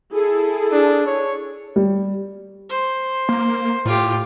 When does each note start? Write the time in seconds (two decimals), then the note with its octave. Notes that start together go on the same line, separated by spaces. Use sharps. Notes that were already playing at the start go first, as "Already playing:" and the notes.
0.13 E4 G#4 A4
0.72 D4
1.07 C#5
1.76 G3
2.69 C5
3.29 A#3
3.85 A2 F4 G4